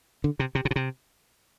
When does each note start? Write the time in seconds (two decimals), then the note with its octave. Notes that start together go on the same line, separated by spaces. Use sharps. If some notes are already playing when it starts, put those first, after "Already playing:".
0.24 D3
0.39 C3
0.55 C3
0.65 C3
0.71 B2
0.76 C3